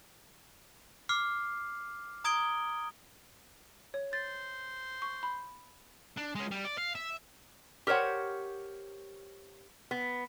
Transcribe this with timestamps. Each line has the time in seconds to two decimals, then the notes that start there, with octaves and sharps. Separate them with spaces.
1.09 D6 F6 C7
2.24 A#5 D#6 G#6 D7 G7
3.94 C#5
4.13 C5 A6
5.02 C#6
5.23 B5
6.17 D4
6.35 G#3 C#4
6.51 G3
6.65 D5
6.78 F5
6.95 E5
7.87 G4 A#4 C5 C#5 F#5
9.91 B3